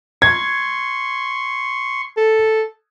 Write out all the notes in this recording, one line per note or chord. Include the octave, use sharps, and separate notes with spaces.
C6 C#6 G#6
A4